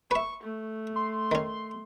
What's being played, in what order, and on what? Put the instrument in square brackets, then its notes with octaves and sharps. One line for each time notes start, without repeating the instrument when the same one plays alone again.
[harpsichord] B4 E5 [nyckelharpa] C#6
[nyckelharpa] A3
[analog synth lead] C6
[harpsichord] D#3 C#4